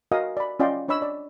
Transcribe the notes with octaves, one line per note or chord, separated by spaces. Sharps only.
F#4 A#4 D#5 F5 G#5 D#6
D5 B5
C#4 F4 D5 D#5 G5 C6
D4 C#5 D#5 B5 E6
D5